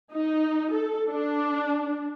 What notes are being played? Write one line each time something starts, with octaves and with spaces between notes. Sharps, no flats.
D#4
A4
D4